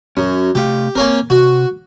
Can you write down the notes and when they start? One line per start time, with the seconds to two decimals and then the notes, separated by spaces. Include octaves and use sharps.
0.17 F#2 C#4
0.55 C3 A3 G4 F5
0.95 A#3 C4 C#4 A#4
1.30 C3 F#4